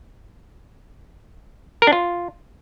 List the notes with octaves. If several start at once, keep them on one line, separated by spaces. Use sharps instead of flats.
A#4
D4
F4